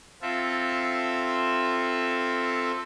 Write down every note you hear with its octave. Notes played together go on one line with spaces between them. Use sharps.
C4 F4 A4 E5